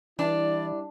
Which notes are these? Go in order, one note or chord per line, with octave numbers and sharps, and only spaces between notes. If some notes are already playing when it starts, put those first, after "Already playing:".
E3 G3 D4 E4 D5